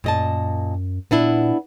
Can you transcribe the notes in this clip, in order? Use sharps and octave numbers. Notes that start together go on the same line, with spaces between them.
F#2 A#2 D#5 A5
A#2 B3 D4 E4